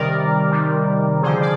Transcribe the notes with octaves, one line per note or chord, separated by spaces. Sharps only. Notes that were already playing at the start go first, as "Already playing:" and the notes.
Already playing: C3 D#3 G3 A#4 D5
C3 D#3 G3
D3 F3 G#4 C5
D5